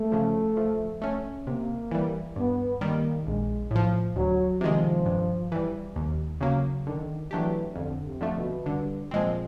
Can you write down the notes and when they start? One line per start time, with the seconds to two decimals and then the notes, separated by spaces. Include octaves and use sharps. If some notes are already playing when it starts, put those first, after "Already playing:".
Already playing: A3
0.12 C#3 F3
0.57 F3
1.02 A3 C#4
1.46 C3 A#3
1.91 E3 G3
2.36 G2 B3
2.81 D#3 G3 A#3
3.26 A#1 G#3
3.71 A2 F3
4.16 D2 F#3
4.61 C3 D#3 F3 G#3
5.06 G2
5.52 E3 G3
5.96 D#2
6.41 C#3 F#3 A#3
6.86 D3 D#3
7.31 E3 F#3 A3 D4 G4
7.76 F2 D3
8.06 C3
8.21 D3 F3 A3
8.36 B2
8.66 G2 D3
9.11 A#2 F3 G#3 C4